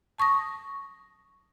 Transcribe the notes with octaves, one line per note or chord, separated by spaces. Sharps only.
A5 C#6 D#6 A#6